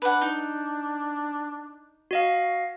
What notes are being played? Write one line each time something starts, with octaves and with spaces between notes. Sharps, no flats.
D4 B4 F#5
D#4
F#4 D#5 F5